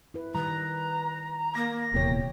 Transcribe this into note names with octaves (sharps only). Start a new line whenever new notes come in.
E4 B4
D#3 G3 B4 A#5
A#3 A#6
D#1 E2 C3 A#3 C#5 G5